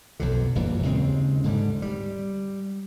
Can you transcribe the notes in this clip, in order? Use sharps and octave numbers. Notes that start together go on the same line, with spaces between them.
B1 F2 D3
G1 F#2 A#2 E3
D#2 C#3 G#3 C4
G#2 D3 G3
G3